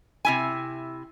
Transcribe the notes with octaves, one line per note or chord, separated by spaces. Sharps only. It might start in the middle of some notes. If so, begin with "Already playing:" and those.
C3 E4 G#5